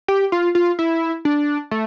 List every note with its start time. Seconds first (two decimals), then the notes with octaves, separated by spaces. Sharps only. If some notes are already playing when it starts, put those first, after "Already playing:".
0.08 G4
0.32 F4
0.55 F4
0.79 E4
1.25 D4
1.71 A3